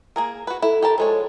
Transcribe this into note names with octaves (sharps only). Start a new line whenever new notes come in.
A#3 G#4 A#4
F#4 B4
E4 A4
G4 A#4 A5
F3 G#3 A4 C#5